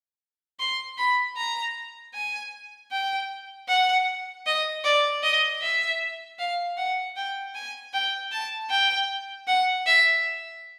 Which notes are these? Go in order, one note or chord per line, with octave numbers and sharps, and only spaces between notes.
C6
B5
A#5
G#5
G5
F#5
D#5
D5
D#5
E5
F5
F#5
G5
G#5
G5
A5
G5
F#5
E5